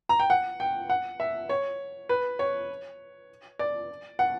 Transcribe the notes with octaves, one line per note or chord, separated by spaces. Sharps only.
A#5
G5
F#5
G5
F#5
E5
C#5
B4
C#5
D5
F#5